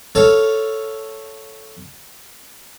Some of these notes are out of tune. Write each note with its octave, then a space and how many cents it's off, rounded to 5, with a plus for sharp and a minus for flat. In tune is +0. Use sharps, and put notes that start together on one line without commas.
A4 +0 C#5 +0 F5 +0